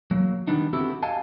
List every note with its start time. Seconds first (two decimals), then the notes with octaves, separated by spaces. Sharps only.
0.11 F#3 A#3
0.48 D#3 G3 A3 B3 D4 D#4
0.73 B3 C4 E4 F#4 G4 A4
1.03 D#5 F5 G#5 A5